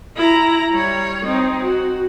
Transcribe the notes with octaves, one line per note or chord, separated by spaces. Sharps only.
E4 A#5
G3 C#5
C4 D#4
F#4